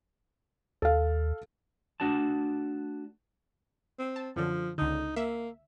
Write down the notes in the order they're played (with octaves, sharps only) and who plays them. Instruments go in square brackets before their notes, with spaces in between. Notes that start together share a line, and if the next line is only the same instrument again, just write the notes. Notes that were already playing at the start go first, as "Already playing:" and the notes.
[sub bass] D#2 [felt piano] A4 F5
[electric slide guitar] A3 D4 F#4 D5 A5
[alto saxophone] C4
[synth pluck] A5
[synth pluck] F#2 D3 [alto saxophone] F3
[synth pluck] C#2 D3 [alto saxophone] D#4
[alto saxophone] A#3 [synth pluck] E5